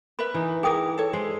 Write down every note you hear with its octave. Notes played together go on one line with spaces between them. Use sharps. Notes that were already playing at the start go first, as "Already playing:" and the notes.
A#4 B4 E5 B5
E3 D#4
E4 G#4 A#4 G5 D#6
A4 C#5
G#3 E4 C5